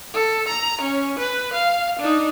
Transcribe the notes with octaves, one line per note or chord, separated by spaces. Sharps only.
A4
A#5
C#4
B4
F5
D4 D#4